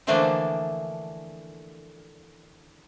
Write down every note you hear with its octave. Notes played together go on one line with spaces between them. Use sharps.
D3 E3 F3 A3 A#3 D4